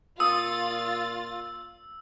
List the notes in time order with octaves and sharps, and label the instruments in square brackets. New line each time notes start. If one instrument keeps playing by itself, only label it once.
[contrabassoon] A#2 [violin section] F4 A6 [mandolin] D#6 [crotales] E6